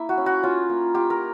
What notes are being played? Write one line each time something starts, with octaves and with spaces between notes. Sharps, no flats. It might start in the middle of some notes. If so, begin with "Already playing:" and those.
Already playing: A#3 E4
F#4
C#4
F#4
C#4 F4
A#3
F4 G4
A#4